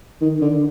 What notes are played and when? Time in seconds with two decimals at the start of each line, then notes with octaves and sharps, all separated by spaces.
0.21 D#3
0.41 D3